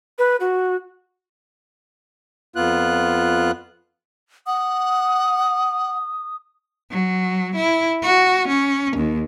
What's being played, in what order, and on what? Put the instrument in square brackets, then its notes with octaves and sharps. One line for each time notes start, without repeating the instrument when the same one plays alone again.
[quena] B4
F#4
[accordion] F2 B3 F4 F#6
[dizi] F#5 [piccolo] D#6
[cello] F#3
E4
F#4
C#4
D#2